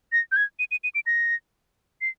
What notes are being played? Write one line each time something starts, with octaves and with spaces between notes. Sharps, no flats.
A#6
G6
G#6
D#7
D#7
D#7
D7
A#6
C7